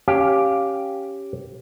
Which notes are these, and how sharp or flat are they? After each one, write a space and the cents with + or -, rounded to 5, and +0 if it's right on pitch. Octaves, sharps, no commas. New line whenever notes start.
C#4 +0 G4 +0 F5 +0